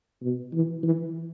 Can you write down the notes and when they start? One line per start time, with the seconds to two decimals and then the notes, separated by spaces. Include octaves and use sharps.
0.22 B2
0.53 E3
0.83 E3